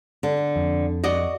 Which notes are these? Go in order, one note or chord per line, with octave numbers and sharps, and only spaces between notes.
D3
F2
F#4 D5 D#5